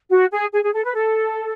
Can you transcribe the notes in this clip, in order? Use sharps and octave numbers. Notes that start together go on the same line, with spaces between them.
F#4
G#4
G#4
G#4
A4
B4
A4